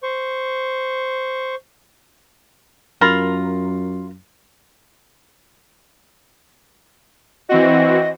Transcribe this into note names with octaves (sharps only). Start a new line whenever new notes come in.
C5 C#6
F#2 F4 A#4 B5 C6
E3 C4 F#4 D#5